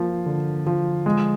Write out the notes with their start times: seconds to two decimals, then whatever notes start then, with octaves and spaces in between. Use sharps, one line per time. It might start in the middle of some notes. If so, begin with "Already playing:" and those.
Already playing: F3 A#3
0.26 D3
0.66 F3
1.06 G#3